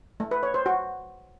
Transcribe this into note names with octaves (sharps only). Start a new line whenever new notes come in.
A3
B4
C#5
C5
F#4